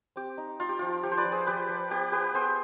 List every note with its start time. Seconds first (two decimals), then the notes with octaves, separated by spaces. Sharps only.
0.16 C4 G4
0.38 D#4
0.60 D#4 F4
0.69 G4
0.79 F3 F4
1.03 F3 G4
1.12 C5
1.18 B4 D5
1.25 F3
1.32 G#4 C5
1.47 F3 G4 B4
1.69 F3
1.90 B3 G4
2.12 B3 G4 B4
2.34 B3 G#4 C5